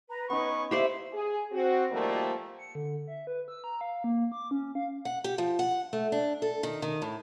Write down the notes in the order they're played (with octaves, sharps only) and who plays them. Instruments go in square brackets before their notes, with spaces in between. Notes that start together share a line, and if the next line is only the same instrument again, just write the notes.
[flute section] B4 A#5
[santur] B3 D#4 [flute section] C#4 [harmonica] B4 C#6
[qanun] G4 C5 D5 [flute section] E5 F5
[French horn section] G#4
C4 F#4
A#2 D#3 F3 G3 A3 A#3
[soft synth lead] C#7
D3
E5
B4
E6
A#5
F5
A#3
D6
C#4
F5
[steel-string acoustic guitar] F#5
G4
F3
F#5
A3
D4
A4
D#3
D#3
A2